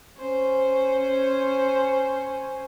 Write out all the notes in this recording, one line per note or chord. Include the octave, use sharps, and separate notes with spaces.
C#4 C5